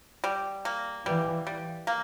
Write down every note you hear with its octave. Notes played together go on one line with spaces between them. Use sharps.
G3
A#3
E3 G3
G3
A#3